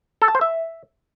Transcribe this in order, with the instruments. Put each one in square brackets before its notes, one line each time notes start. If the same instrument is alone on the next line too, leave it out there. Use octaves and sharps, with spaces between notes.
[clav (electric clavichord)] A4
A5
C5
E5